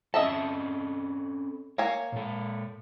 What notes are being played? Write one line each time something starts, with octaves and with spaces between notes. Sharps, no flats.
C4 C#4 A4 D#5 E5 A5
A#3 C#5 G#5
A#2 A4